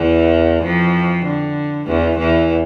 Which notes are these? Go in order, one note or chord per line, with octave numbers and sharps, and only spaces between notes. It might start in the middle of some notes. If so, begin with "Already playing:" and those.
Already playing: E2 E3
F2 F3
D3
E2 E3
E2 E3